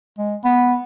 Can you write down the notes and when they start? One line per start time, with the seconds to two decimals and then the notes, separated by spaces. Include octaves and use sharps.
0.18 G#3
0.45 B3